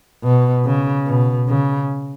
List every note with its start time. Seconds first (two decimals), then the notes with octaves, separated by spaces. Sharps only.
0.24 B2
0.65 C#3
1.07 B2
1.49 C#3